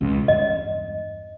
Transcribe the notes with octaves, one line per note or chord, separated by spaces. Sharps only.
C#2 C#4
E2 G2 D#5